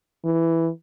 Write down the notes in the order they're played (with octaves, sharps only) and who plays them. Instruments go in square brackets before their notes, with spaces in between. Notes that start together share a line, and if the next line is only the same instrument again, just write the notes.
[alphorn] E3